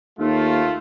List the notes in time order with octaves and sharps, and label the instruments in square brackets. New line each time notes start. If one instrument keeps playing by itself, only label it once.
[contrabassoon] D#2 [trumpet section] A3 F4